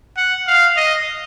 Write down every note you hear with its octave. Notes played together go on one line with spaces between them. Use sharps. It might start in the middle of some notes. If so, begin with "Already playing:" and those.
F#5
F5
D#5